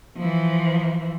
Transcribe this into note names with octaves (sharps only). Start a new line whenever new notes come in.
E3 F3